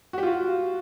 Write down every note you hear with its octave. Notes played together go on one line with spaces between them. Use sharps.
F#4
G4
F4
F#4